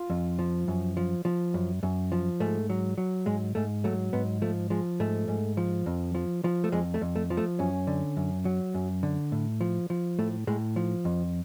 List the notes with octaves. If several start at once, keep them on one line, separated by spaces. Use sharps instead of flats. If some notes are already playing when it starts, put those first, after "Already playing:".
Already playing: F4
F2
F3
F#2
F3
F3
F#2
F#2
F3
G#2 A3
F#3
F#3
G#2 G#3
G#2 A3
F#3 A3
G#2 B3
F3 A3
F3 G#3
G#2 A3
G#2
F3
F2
F3
F3
A3
F2 G#3
A3
F2
A3
F3
A3
F#2 C#4
D3
F#2
F#3
F#2
D3
A2
F3
F3
A2 A3
A2 G#3
F3
F2